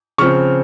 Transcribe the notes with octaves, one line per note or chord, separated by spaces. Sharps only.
C#3 F3 C4 C#6 F6